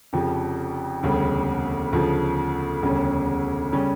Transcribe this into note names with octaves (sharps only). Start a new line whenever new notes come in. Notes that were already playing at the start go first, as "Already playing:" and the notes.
F1 F2 C#3 F3
E1 D2 C#3 G3
D2 C#3 F3
E1 D2 C#3 G3 C#4
C#3 G3 C#4